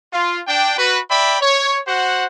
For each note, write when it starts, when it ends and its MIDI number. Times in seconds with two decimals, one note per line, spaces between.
0.13 0.39 65
0.48 0.74 62
0.48 0.74 79
0.78 0.99 66
0.78 0.99 71
1.10 1.36 74
1.10 1.36 76
1.10 1.36 79
1.10 1.36 83
1.41 1.79 73
1.87 2.25 66
1.87 2.25 72
1.87 2.25 78